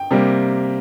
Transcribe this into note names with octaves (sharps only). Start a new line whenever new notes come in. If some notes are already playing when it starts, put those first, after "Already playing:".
Already playing: G5
C3 G3 A#3